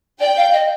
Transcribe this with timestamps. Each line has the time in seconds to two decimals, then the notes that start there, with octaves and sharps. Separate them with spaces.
0.20 D5 G5
0.37 F5
0.53 D#5